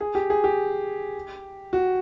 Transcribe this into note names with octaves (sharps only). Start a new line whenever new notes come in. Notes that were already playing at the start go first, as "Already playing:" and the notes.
G#4
G4
G#4
G4
F#4